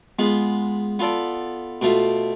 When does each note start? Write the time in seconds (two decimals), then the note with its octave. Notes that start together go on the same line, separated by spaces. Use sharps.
0.19 G#3 B3 F4
0.99 B3 F4 A4 D5
1.81 B2 A3 F4